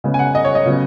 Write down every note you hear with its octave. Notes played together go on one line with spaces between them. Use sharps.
C#3 G#3 B3
G#5
F#5
D#5
C#5
D#5
C#3 F#3 B3